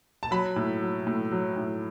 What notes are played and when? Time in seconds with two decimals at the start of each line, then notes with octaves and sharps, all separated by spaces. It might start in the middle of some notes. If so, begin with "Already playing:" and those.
0.23 A5
0.31 F#3 B5
0.56 A2
0.81 F#3
1.07 A2
1.31 F#3
1.57 A2